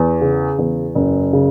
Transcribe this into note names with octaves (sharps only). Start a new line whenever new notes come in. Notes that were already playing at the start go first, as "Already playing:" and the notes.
Already playing: E2
C#3
E2
F#1
C#3